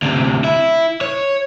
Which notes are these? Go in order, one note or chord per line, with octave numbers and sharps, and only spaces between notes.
D2 C3
E4
C#5